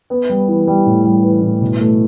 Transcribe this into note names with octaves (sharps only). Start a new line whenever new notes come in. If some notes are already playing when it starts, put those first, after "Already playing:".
B3
G3
E3
G3
A2
G3
E3
A2
B2
A3